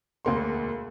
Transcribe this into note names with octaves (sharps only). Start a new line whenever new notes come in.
E1 D2 A#3 C6